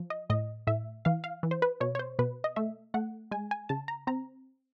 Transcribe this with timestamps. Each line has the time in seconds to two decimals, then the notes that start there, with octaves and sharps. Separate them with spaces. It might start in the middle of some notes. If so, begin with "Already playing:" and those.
Already playing: F3
0.10 D#5
0.30 A2 D#5
0.67 A2 E5
1.05 E3 F5
1.24 F5
1.43 E3
1.51 C5
1.62 B4
1.80 B2 C#5
1.95 C#5
1.99 C5
2.19 B2 B4
2.44 D#5
2.56 A3 E5
2.94 A3 F#5
3.31 G#3 G#5
3.51 G#5
3.69 C#3 A5
3.88 A#5
4.07 C4 A#5